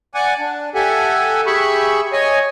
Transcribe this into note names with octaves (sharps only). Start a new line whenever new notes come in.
D5 F#5 G#5
D4
G4 A4 E5 F#5 G#5
G4 G#4 E5 B5 C#6
C#5 D#5 G#5